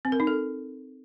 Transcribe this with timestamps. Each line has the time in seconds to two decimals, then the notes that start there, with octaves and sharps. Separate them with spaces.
0.05 C4
0.12 A#4
0.20 D#4
0.27 A4